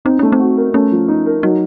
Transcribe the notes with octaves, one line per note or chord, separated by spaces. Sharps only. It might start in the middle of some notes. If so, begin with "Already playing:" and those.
C4 D#4
A3 C#4
C4
F#4
A#4
A3 C#4
F3
D#4
A#4
F#3 D#4